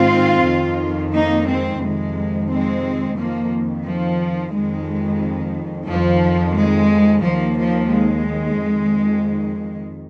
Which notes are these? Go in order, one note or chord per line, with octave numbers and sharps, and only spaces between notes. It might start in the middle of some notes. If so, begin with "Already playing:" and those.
Already playing: G#2 D#3 C4 F4
F2 D#3
A#3 D#4
G#3 C4
F2 C3 D#3 G#3
G#3 C4
F2 D#3 F3 A#3
F3
F2 D#3 G#3
F2 D#3 F3
G#3
D#2 D#3 F3 A#3
F3 A#3
G#3
F2 D#3